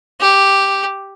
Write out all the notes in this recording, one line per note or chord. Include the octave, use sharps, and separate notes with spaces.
G4